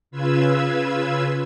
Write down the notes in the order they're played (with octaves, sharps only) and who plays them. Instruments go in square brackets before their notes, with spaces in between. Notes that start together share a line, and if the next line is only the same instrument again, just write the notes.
[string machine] C#3 F4 B4 E6 G#6